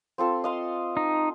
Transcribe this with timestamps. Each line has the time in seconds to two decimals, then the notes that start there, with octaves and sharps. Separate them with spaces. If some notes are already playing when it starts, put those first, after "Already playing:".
0.18 C4 F4 A4
0.44 D#5 F5 C6
0.97 D#4